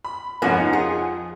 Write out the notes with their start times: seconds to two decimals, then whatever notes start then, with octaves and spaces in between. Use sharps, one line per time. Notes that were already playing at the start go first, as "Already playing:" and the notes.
0.05 B5
0.42 F2 F3 A#3 B3 C#4 F#5 G#5
0.58 D#4
0.73 F4 G#4